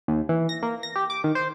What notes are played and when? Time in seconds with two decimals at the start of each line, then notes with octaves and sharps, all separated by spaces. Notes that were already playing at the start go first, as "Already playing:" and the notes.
0.08 D#2
0.29 E3
0.49 A#6
0.63 A#3
0.83 A#6
0.96 G4
1.10 D6
1.24 D#3
1.35 C5